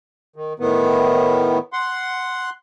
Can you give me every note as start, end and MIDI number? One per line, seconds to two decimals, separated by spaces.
0.36 0.53 51
0.59 1.59 45
0.59 1.59 51
0.59 1.59 59
1.73 2.50 78
1.73 2.50 84